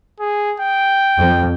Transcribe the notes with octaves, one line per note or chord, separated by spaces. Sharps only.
G#4
G5
F2